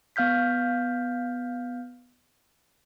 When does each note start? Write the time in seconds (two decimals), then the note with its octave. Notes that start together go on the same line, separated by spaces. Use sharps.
0.16 B3 F5 F6 G6 B6